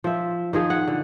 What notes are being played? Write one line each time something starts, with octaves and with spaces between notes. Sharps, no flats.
F3 E5
D#3 F3 G#4
F#5
D3